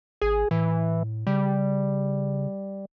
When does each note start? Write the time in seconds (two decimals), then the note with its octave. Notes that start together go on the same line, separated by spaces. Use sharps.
0.22 G#1 G#4
0.51 A2 E3
1.27 C#3 G3